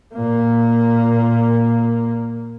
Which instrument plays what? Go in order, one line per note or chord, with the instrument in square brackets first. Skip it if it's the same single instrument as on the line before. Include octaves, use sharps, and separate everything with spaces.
[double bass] A#2 A#3